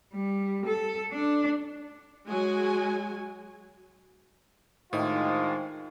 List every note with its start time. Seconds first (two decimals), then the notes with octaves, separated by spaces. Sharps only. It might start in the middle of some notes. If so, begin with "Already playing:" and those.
0.14 G3
0.66 A4
1.12 D4
2.27 F#3 G#3 F#4 G#5
4.93 A2 D#3 G#3 D4 F4 C5 D#5 G5